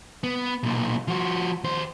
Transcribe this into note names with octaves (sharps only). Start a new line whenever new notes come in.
B3
B1 A#2
F3 F#4
D#2 C5